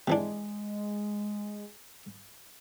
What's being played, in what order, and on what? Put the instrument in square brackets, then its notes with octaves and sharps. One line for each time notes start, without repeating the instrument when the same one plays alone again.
[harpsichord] C3 E3 D4 [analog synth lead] G#3